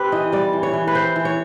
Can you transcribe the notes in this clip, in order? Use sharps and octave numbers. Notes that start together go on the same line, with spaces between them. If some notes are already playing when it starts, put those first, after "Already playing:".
Already playing: C4 G4 B4
E3 D#5
G3 D5
E3
C#5
E3
B4
C4 C5
E3
C#5